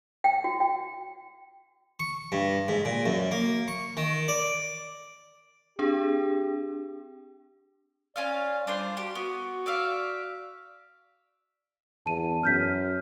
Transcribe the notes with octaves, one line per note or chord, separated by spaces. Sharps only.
G5
F#4
G5
C#6
G2
G#2
A#2
F#2
A#3
C#6
D#3
D5
C4 D4 G4 G#4
C#4 F4 D5 F5
G3 D4 F4 C5
F#4 G4
B3 F#4
D5 E5 F5
E2 A5 D#7
F#2 F6 G6 B6